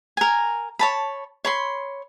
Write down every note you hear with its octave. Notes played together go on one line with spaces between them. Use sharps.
A#4 G#5
C#5 A5 B5
C#5 B5 C6